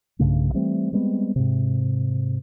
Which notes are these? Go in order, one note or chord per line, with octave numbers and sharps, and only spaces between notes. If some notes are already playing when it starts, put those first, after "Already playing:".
B1 G2 C#3 A3
E3 G3 A3 C4
G3 G#3 B3 C4
G#2 C3